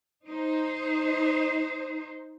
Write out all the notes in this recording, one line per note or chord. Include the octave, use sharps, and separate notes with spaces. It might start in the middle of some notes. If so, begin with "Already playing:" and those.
D#4 C5